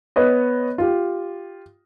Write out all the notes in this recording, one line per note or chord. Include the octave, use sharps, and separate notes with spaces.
B3 B4 C#5 D#5
F4 G4